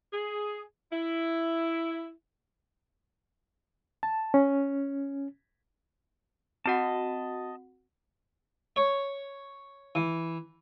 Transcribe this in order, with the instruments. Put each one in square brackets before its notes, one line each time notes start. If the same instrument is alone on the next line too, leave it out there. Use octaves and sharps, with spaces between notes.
[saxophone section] G#4
E4
[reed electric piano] A5
C#4
[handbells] C4 F#4 F#5 [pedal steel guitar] D#5 A5
[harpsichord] C#5
E3